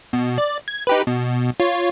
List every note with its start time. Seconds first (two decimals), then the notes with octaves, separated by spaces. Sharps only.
0.13 B2
0.38 D5
0.68 G#6
0.87 D#4 G4 B4
1.07 B2
1.60 F4 C#5